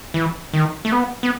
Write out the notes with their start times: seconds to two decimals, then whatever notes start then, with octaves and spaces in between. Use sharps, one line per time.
0.14 E3
0.53 D#3
0.85 A3
0.92 B3
1.23 B3